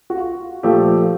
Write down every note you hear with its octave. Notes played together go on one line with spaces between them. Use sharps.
F#4
F4
A#2 F3 A3 G4